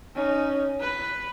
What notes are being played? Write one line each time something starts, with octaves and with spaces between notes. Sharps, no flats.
C#4 D#4
B4